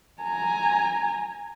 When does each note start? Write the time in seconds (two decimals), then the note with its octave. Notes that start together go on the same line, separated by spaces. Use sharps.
0.22 G#5 A#5